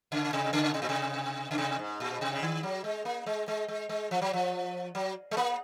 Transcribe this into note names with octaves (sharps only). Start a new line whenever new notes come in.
C#3
C3
C#3
C3
A#2
C3
C#3
C3
G#2
A#2
C3
C#3
D#3
F#3
G#3
A#3
G#3
G#3
G#3
G#3
F3
F#3
F3
F#3
G#3
A#3